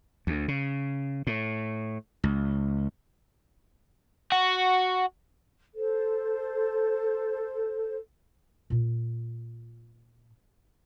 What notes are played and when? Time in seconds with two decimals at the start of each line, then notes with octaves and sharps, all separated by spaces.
0.27 D2
0.48 C#3
1.27 A2
2.24 C#2
4.32 F#4
5.74 A4 C5
8.70 A#2 F4